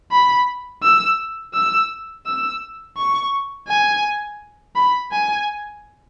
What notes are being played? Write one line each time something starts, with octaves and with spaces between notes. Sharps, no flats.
B5
E6
E6
E6
C#6
G#5
B5
G#5